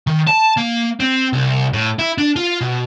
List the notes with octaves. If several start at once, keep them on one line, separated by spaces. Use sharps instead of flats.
D#3
A5
A#3
C4
C2
A2
E4
D4
F4
B2